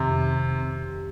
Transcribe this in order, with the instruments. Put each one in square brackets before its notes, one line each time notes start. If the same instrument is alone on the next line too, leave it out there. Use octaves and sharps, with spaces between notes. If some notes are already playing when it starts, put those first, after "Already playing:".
Already playing: [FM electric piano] F2 D#3 C4 G4 [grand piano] C3